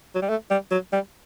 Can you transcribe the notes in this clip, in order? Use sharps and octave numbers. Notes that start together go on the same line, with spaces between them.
F#3
G3
A3
G3
F#3
G3